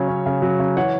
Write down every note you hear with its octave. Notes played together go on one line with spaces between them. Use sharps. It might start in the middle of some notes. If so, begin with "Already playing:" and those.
Already playing: C#3 F#3 C#5
C#4
C#3
F#3
C#3
E3 C#5 F#5